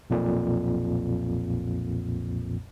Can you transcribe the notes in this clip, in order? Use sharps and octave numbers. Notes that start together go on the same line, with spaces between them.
B1 F2 A#2